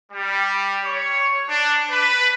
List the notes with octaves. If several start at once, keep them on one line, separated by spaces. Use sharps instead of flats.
G3
C#5
D4
B4